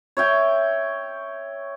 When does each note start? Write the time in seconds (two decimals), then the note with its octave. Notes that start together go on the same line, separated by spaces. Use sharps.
0.17 C#5 E5 G5